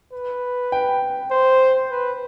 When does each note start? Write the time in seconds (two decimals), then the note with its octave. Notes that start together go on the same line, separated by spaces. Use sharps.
0.12 B4
0.72 G5
1.31 C5
1.91 B4